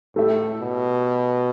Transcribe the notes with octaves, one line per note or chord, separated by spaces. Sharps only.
A2 A3 G4 E5
B2